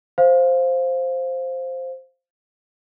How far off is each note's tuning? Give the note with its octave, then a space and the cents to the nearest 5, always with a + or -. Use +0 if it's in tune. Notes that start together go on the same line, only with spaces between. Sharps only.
C5 +0 F5 +0